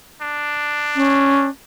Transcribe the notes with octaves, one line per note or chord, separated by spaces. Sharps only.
D4
C#4